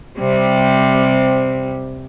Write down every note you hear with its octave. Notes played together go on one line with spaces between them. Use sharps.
C3 G3 C4